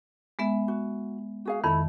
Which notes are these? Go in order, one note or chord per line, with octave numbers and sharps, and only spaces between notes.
G#3 B3 E5
F#4
F#4 G#4 F5
F2 D#3 E4 A4 B5